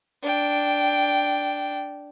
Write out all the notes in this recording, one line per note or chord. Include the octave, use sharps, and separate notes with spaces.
D4 G5